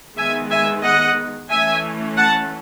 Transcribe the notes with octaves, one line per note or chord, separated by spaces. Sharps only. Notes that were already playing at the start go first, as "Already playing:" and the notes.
D#3 G#3 B3 E5 G#5
E5 G#5
D#5 F#5
E3 A3 C#4 E5 G#5
F#5 A5